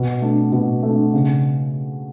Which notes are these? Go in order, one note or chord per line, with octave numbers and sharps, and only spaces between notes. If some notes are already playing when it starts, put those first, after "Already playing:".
Already playing: B2
A3 D4
B2
A3 D4
C#3